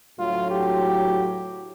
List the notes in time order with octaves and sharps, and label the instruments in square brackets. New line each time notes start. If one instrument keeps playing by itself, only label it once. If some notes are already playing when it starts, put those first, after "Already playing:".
[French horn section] D2 A2 F#3 [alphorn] F4
[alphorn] G4